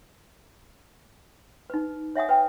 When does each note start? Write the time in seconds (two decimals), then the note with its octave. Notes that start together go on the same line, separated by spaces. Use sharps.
1.70 D#4 B4
2.16 C#5 E5 F#5 G#5 D#6
2.29 B4 G5